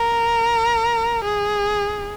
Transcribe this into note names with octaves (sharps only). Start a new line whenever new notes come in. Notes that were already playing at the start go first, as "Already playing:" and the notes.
Already playing: A#4
G#4